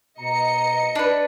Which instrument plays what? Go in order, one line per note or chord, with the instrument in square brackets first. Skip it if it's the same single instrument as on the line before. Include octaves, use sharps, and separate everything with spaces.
[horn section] B2 A#5 [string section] D#5 C#7
[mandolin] D4 B4